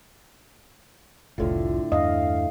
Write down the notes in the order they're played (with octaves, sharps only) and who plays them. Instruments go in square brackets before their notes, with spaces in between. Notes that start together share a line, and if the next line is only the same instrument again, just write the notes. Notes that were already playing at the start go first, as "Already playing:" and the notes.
[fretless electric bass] F1 C2 [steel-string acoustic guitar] A2 D3 [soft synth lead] F4
[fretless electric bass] E2 G2 D4 [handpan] D#5 [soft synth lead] F5